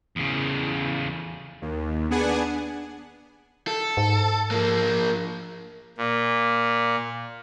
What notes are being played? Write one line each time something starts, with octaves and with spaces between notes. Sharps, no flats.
E2 C#3
D#2
B3 D4 G#4 F#5 G#5
A4
G#2
F3 A#3
A#2